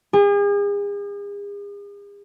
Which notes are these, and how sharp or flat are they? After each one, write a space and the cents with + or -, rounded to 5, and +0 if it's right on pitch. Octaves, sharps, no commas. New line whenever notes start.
G#4 -40